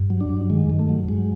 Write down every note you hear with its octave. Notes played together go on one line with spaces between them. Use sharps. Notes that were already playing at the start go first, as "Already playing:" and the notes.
Already playing: G2
F#3
D4
G2
D#3 G#3
G2
A3
F#3
G2 G#3